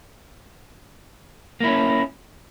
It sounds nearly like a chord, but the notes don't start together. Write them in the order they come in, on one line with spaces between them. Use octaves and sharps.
A#3 E4 C#4